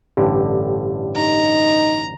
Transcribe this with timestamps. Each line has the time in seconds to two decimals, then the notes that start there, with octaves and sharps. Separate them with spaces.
0.17 A1 G2 D3 G4
1.16 D#4 A#5